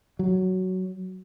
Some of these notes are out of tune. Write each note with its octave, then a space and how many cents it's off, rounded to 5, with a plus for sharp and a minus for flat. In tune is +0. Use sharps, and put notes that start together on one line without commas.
F#3 +5